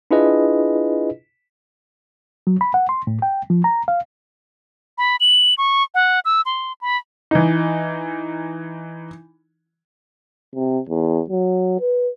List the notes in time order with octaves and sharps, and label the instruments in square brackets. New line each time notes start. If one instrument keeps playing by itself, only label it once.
[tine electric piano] D4 E4 F4 G#4 B4 D#5
[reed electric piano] F#3
B5
F#5
C6
A2
G5
F3
A#5
F5
[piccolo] B5
F#7
C#6
F#5
E6
C6
B5
[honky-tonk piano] E3 D#4
[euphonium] C3
E2
F#3
B4